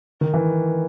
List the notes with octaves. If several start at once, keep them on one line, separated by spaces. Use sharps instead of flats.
D#3
E3